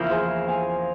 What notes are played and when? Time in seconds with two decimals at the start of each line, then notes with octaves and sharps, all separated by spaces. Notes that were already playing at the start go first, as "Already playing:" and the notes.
Already playing: E2 C#3 F3 A#3 E4 A#4
0.10 G#4 C5
0.48 F5 G#5